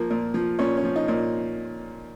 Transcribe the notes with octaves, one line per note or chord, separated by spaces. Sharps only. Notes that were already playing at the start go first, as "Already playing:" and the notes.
Already playing: F3 A#3
A#2
F3
A#2 C#4
C#4
F3
D#4
A#2